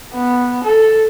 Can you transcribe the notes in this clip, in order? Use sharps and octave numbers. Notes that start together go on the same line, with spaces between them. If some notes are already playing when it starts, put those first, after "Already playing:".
B3
A4